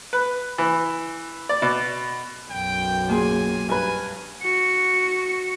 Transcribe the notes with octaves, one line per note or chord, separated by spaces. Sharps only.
B4
E3
D5
B2
B1 F#2 G5
A#2 G#4 G#5 C6
G2 B4 G#5
F#4 C#7